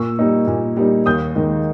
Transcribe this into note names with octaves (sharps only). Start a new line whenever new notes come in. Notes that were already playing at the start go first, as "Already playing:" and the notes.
Already playing: A#2 C#6 E6
G3 A#3 D#4
A#2
G3 A#3 D#4
D#2 D#6 G6
D#3 G#3 D#4